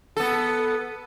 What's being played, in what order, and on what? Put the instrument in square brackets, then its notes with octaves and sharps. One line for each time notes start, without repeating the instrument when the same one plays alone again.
[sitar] B3 A4